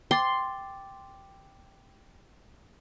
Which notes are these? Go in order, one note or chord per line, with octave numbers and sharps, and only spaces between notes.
G5 C6 D6 A6